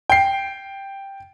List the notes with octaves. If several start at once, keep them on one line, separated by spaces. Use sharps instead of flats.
G5 C7